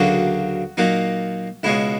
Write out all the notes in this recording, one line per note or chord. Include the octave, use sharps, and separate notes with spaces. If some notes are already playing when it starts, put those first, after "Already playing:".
Already playing: D2 C#3 F#3 A#3 D4 F#4
A#2 F#3 A#3 D#4
C#2 B2 G#3 C#4 E4